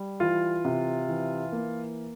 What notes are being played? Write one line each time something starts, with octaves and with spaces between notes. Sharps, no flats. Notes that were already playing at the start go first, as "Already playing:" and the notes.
Already playing: G3
E3 F4
C3
E3
A#3